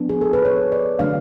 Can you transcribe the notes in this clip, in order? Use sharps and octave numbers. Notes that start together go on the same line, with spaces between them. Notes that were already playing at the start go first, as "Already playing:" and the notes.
Already playing: F3 B3 D4
G#4
A4
B4
C#5
D5
D3 F#3 A3 D4 F5